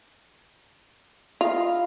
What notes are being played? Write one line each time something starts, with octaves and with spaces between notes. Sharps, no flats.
E4 F4 D#5 F5